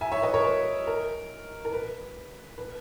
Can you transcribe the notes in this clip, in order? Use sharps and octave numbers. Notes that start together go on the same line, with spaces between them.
E5 G#5
C#5 E5
B4 D#5
A#4 C#5
B4
A#4
A#4
B4
B4